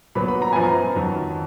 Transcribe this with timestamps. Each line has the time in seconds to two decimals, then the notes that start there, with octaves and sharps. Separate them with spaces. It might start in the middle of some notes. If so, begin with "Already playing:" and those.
0.15 A#2 F#3 B3 B5
0.28 B5
0.42 A#5
0.53 F#2 F3 B3 G#5
0.64 A#5
0.95 F2 D#3 F#3